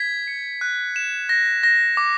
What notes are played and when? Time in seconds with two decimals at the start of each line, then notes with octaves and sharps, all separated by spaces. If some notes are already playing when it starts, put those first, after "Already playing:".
Already playing: G#6 B6
0.27 C#7
0.61 F#6
0.96 E7
1.29 A#6
1.63 A#6
1.97 D6